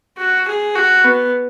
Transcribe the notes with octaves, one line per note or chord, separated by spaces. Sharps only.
F#4
G#4
F#4
B3